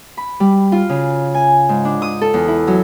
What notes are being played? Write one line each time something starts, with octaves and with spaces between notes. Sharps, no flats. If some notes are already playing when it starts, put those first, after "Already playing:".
B5
G3
F4
C#3
G#5
G#2
D4
D#6
A4
E2
E4
F#3